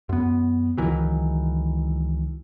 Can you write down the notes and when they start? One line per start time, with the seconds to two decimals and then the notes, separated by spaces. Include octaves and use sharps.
0.09 F#2 B3
0.77 C#2 D#3 E3 F#3